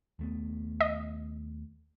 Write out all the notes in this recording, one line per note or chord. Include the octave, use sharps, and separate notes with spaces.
D#2 A3 B3
D#5